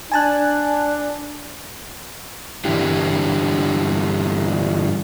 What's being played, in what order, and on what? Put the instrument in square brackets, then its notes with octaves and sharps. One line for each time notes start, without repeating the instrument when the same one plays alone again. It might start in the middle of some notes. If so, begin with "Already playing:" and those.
[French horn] D4 [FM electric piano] G#5 A5 F#6
[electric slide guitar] G2 D3 E3 D4 E4 G4